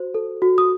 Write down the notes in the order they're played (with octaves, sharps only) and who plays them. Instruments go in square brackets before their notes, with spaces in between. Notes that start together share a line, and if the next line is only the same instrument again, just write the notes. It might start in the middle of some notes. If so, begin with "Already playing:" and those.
Already playing: [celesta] F#4 C5
A4
F#4
D#6